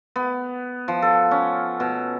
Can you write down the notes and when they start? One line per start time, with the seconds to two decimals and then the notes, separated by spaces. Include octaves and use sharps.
0.16 B3
0.88 F3
1.02 A4
1.31 C#4
1.80 B2